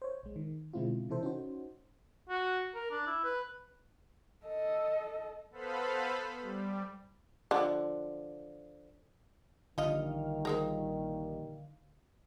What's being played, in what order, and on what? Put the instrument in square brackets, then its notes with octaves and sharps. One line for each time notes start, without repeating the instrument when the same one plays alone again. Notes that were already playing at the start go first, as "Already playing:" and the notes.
[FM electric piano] C5 C#5
A#1 G#3
D#3
B2 D3 G#3 C4 E4 F4
C3 E3 E4 A4 C5
C#4 D#4 F#4 C5
[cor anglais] F#4
A#4
D4
E4
B4
[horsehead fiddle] A4 D#5
[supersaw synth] B3 A4 B4 C5 F5 B5
G3
[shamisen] D3 F3
[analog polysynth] A#1 A#2 G3 [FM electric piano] D3 F5 [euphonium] D#3 [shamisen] F4 D#5
[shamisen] C4 G#4 A#4